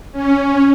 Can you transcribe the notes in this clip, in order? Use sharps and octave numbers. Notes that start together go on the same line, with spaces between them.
C#4